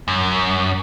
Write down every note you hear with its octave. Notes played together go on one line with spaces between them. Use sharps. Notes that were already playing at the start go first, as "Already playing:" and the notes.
F#2